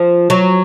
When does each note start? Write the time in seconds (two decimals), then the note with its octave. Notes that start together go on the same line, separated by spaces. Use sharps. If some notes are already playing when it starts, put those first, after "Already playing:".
Already playing: F3
0.30 F#3